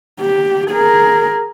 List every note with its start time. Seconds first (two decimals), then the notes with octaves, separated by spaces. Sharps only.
0.20 G4
0.70 G#4 A#4